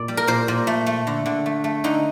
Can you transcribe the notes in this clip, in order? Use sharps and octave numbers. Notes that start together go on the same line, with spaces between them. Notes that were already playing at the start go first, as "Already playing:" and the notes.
Already playing: A#2 D5
G3
A#4
A#2 C5
A#2
A3
A3
D3
D3
A3
A3
D3 D#4